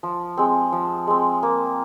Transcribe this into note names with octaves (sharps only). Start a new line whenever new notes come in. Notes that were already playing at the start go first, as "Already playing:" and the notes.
F3
G#3 C4
F3
G#3 C4
A#3